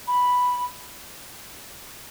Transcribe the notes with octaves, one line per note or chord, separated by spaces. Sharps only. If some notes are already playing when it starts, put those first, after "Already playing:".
B5